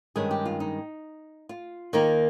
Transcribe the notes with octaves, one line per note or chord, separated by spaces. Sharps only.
G2 D#3 G#3 C#4 G#4
G4
F4
D#4
F4
D#2 D#3 A#3 D#4